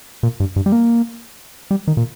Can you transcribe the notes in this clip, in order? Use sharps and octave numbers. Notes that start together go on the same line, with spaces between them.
A#2
G2
G2
G3
A#3
G3
D#3
A#2